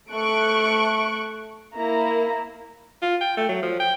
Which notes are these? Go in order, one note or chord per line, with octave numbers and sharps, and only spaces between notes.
A3 C#6 F#6 D7
A#3 E4 A#5
F4
G5
A3
F#3
F3
G5